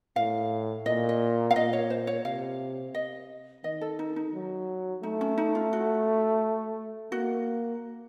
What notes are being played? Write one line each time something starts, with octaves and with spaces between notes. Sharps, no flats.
A2 F5
A#2 D#5
D#5
F5
A#2 D#5
C#5
C5
C#5
C3 F5
D#5
D#3 D#5
A4
D#4
D#4
F#3
A3 D#4
C#4
D#4
F4
F#4
A#3 F#4